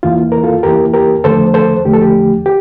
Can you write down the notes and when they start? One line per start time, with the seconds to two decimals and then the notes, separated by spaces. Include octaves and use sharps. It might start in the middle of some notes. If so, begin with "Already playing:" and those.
0.03 E2 E3 A#3 E4 F4
0.32 A#4
0.43 F4 A4
0.63 E2 E3 A#3 E4 G4 A#4
0.93 G4 A#4
1.24 E2 D3 F3 A3 A4 C5
1.54 A4 C5
1.85 E2 D3 F3 A3 G4
1.94 A4
2.01 G4
2.46 G4